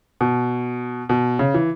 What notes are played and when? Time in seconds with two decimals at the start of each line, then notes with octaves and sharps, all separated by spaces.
0.21 B2
1.09 B2
1.39 C#3
1.54 E3